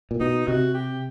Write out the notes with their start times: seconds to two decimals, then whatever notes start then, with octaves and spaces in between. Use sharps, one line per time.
0.11 A#2
0.20 B2 D#4
0.47 C3 F#4
0.74 G4